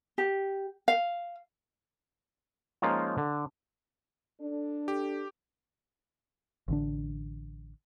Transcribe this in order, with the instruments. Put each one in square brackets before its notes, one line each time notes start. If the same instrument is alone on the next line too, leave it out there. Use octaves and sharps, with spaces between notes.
[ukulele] G4
F5
[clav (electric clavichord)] F3 G#3 A#3 C#4 D#4 F4
D3
[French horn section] D4 A4
[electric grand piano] G4
[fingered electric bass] A1 D3 D4